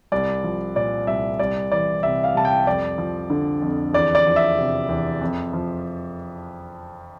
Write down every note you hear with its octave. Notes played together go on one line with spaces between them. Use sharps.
C2 D5
F3
A#2 D5
C2 E5
C2 D5
E3 D5
C3 E5
F5
C2 A5
G5
F2 D5
F3
D3
F2
E2 D5
D5
F3
E5
C3
E2
F2
F3